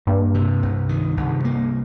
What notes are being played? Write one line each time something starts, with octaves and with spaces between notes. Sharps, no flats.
G2 A#3
C3
C2
D#3
C2
A#3